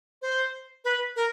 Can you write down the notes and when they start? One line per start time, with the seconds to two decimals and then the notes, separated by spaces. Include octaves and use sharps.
0.22 C5
0.85 B4
1.16 A#4